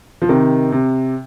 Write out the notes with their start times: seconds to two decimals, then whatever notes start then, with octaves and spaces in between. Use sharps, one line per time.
0.22 F3
0.29 C3 D#3
0.72 C3